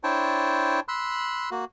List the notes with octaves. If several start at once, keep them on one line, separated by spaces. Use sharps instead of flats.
D4 E4 C5 C#5 G5 A5
B5 C6 E6 F#6
A#3 F#4